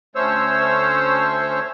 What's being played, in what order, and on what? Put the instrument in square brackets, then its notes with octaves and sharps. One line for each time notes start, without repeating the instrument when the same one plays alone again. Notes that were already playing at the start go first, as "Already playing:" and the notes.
[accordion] D2 A3 C#4 C5 C#5 E6